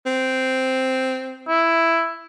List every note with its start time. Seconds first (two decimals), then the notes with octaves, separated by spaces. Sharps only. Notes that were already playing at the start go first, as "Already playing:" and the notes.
0.06 C4
1.48 E4